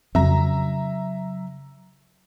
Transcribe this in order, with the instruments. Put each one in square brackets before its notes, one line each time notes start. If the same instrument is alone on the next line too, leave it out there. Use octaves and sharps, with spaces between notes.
[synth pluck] F2 [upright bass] C#3 F#3 [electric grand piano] E5 A#5